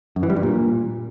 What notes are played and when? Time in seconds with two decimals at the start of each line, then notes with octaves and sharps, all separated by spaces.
0.16 F#2
0.23 E3
0.30 G3
0.36 G2
0.43 A#2